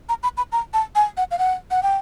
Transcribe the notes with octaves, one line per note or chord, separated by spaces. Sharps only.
A#5
B5
B5
A#5
A5
G#5
F#5
F5
F#5
F#5
G5